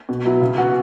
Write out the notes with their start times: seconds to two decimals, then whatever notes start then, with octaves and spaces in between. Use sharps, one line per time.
0.09 B2
0.26 F#3 B3 E4
0.41 C#3
0.58 E3 B3 F#4